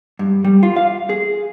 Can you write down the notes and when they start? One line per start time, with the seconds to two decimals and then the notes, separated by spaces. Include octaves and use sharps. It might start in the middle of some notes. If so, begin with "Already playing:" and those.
0.19 G2
0.44 G3
0.63 F4
0.76 F5
1.09 G#4